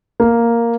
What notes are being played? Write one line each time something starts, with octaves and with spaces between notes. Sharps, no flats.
A#3